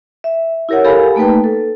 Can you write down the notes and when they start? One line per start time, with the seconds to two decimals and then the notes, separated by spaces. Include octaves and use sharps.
0.24 E5
0.69 E4 G4 A#4 C#5 F#5
0.85 G4 A4 A#4 F5 G#5 B5
1.16 A3 A#3 D#4 B4 G5
1.44 A4